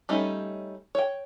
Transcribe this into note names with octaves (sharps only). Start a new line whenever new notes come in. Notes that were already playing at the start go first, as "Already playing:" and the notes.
G3 A3 C#4 D#4
C#5 G5